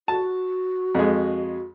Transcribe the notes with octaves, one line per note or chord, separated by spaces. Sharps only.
F#4 A5
F2 G#3